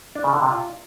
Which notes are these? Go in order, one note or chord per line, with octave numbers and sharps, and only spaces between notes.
D4
C#3
D3
C3
F4